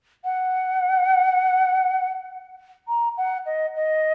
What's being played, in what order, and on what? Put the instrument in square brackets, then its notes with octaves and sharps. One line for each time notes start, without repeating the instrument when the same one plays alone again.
[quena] F#5
A#5
F#5
D#5
D#5